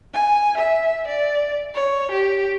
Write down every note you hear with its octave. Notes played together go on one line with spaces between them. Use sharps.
G#5
E5
D5
C#5
G4